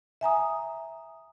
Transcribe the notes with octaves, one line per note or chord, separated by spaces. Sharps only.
E5 G#5 A#5 D#6